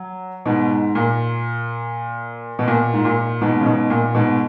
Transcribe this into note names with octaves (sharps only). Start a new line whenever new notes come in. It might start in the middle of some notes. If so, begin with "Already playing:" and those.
Already playing: F#3
G#2 B2
G#2
A#2
B2
A#2
G#2
A#2
G#2 B2
C#3
G#2 B2
A#2
G#2 B2